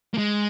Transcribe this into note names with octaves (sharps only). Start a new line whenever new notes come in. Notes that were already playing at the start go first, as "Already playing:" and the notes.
A#3
G#3